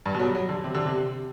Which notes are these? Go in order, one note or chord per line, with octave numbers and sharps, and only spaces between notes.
G2
B2
F#3
G3
F#3
D3
C3
D3
C3